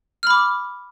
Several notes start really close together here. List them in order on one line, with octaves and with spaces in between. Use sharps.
F6 B5 D6